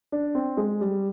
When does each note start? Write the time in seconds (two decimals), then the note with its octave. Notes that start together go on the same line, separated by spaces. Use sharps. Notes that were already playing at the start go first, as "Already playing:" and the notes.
0.12 D4
0.35 C4
0.57 G#3
0.81 G3